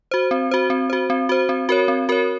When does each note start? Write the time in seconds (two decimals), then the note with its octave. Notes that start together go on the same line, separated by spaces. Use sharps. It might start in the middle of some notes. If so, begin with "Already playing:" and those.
0.11 F#4 C5
0.31 C4
0.51 F#4 C5
0.70 C4
0.90 F#4 C5
1.10 C4
1.29 F#4 C5
1.49 C4
1.69 F#4 A#4 C#5
1.88 C4
2.09 F#4 A#4 C#5